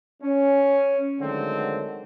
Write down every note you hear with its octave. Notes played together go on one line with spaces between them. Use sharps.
C#4
D3 D#3 F#3 G#3 A3 C4